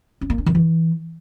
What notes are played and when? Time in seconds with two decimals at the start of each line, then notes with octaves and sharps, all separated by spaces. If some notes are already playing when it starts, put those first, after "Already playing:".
0.21 C#4
0.30 A#3
0.38 D4
0.46 D#3
0.55 E3